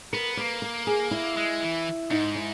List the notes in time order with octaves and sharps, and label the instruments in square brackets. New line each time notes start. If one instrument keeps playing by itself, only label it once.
[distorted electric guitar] B3 [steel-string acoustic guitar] A#4
[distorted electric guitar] A#3 [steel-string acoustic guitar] B4
[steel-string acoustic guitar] A#4
G#4
E4
[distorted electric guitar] G#3
E3
[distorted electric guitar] G#2 [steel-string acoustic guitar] D#4
[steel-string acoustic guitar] E4